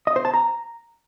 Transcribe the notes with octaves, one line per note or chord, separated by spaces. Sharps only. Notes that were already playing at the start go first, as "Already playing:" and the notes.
D#5
C5
A5
A#5